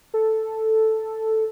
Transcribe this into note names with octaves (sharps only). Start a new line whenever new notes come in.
A4